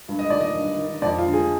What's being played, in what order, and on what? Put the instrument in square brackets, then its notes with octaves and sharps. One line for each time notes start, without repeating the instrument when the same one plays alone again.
[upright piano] G2
D#5
D#3 D5
D#5
G2
D#3
F2 D5
F4
D3
G#4